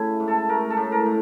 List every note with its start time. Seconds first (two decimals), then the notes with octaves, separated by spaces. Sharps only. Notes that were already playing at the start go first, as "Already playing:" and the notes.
Already playing: C#3 A3 E4
0.20 G#2
0.28 A4
0.49 A3 A#4
0.70 A4
0.77 A2
0.92 A#4
1.06 A2